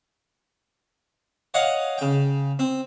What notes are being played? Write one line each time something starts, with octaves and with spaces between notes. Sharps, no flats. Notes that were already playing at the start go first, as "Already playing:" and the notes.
C#5 D#5 F5 F#5
C#3 G5
C4